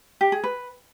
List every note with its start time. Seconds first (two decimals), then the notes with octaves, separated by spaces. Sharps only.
0.21 G4
0.32 G#4
0.44 B4